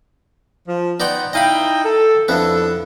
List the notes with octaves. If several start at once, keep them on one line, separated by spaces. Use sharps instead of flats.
F3
B3 D#4 D5 F#5 G5 C6
D#4 E4 D#5 F5 G5 B5
A4
F2 B3 D4 E4 A4